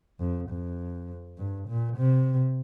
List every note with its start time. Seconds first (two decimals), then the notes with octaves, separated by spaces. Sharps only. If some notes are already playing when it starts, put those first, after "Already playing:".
0.20 F2
0.50 F2
1.38 G2
1.68 A#2
1.97 C3